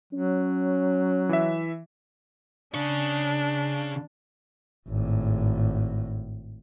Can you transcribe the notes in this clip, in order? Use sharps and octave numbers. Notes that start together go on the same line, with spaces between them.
F#3 C#4
E3 E5
C#3 D4 C#5
G#1 A2